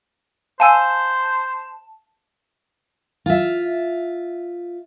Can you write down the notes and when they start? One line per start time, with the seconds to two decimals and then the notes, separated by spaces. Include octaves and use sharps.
0.60 C5 F5 G#5 A5 E6
3.26 F4 E5